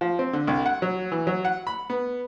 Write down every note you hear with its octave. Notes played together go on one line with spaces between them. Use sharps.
F3
C4
D3
C2
F#5
F#3
E3
F#3
F#5
B5
B3